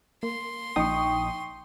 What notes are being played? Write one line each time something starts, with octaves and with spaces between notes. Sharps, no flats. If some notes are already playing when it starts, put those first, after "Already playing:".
A#3 C6
A#1 D#4 G5 C#6 D#6